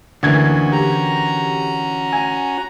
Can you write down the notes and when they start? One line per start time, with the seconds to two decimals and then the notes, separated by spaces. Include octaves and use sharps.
0.23 D2 D3 E3 A#3 C#4 F#4 G#6
0.72 G4 A#5
2.12 G#5